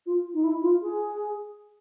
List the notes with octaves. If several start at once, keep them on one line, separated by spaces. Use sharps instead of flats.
F4
D#4
E4
F4
G#4